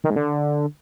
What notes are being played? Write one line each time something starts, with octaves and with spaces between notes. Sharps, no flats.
D#3
G#2
D3